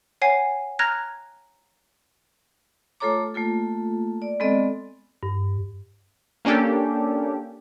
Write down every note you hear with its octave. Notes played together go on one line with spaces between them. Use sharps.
C#5 F#5 G#5 C7
A#5 F6 F#6 G#6 A#6
A3 F4 A4 C#5 A#5 D6
A3 A#3 F4 A4
D5
G#3 B3 C4 A4 D5 D#5
G2
A#3 C#4 D4 G4 A4